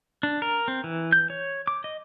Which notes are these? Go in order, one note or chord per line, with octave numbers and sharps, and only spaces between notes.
D4
A#4
C4
E3
G6
C#5
D6
D#5